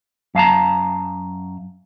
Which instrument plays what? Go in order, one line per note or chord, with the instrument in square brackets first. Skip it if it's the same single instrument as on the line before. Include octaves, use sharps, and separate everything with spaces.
[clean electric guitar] F#2 F5 A5 A#5